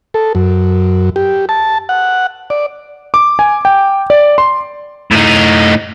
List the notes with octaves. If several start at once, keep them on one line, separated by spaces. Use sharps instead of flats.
A4
F#2
G4
A5
F#5
D5
D6
G#5
G5
D5
C6
A2 D#4